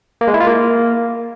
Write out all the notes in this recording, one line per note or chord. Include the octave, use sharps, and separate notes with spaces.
A#3
G#3
E4
F4
A#3